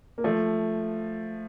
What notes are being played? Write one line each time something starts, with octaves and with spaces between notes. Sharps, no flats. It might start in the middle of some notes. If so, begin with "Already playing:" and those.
A#3
F3 A3